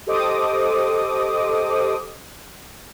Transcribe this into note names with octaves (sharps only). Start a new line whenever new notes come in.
G4 A4 C5 D#5 D6 D#6